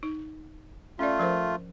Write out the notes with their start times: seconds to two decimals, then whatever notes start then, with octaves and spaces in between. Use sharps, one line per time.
0.03 D#4
0.99 A3 C#4 F4 D5
1.19 F3 A#4 C5